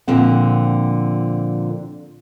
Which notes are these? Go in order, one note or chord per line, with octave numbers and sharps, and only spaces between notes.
A#2 D3 F3 C4 F#5